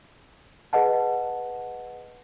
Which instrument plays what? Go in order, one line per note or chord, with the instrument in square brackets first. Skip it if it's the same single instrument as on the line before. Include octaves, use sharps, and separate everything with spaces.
[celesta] G#4 B4 D#5 F#5 A5